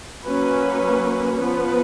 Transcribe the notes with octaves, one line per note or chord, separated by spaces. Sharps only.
F#3 A#3 C#4 B4
F3 B3 B4